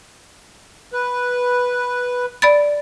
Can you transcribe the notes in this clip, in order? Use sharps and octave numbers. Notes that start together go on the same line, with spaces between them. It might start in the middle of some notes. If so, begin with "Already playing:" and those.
B4
D5 B5 A6